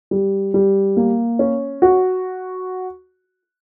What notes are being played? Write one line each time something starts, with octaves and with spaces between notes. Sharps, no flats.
G3
G3
A#3
C#4
F#4